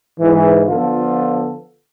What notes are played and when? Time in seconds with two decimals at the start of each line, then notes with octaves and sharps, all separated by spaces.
0.19 G#2 E3
0.67 D3 F3 B3 F4 A4